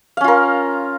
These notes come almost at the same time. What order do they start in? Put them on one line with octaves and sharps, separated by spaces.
F5 C#4 F4 A#4